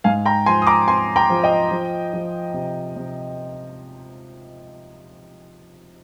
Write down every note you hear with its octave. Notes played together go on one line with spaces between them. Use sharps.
G#2 F5 G#5
G5 A#5
F3 G#5 C6
D#6
A#5 D6
C4 G#5 C6
G5 A#5
F3
D#5 G5
F3
F3
C3
C3